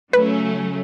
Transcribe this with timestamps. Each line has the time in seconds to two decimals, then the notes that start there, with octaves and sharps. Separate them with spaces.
0.13 C#3 F#3 A3 C#4 B4